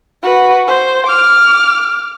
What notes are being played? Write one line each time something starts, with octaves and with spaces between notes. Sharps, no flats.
F#4 B4
C5
D6 F6